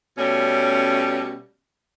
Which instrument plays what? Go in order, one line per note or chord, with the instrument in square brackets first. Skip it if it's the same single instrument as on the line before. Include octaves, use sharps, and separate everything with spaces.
[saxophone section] B2 G3 A3 C#4